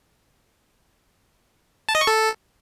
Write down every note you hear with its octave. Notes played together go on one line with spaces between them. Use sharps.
A5
D#5
C#6
A4